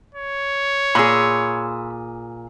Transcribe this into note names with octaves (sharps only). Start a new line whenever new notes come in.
C#5
A#2 G#4 B5 C6 E6